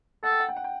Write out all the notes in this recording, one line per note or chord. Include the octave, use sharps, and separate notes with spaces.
A4 F#5
G5
F#5
G5
F#5
G5